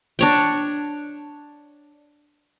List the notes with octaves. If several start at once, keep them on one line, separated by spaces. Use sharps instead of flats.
D4 C#5 G5